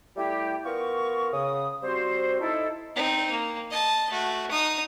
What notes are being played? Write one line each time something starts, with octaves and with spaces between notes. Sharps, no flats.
G3 A3 E4 G4
B3 F4 A#4 C#6
C#3 D#6
G3 C4 F#4 C5
D#4 E4 A4
C4 D#4
A#3
D#5 A5
A3 F#4
D#4 D#6